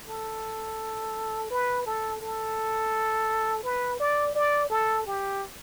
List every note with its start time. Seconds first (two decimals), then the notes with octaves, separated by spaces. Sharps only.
0.08 A4
1.50 B4
1.86 A4
2.21 A4
3.64 B4
4.00 D5
4.35 D5
4.70 A4
5.06 G4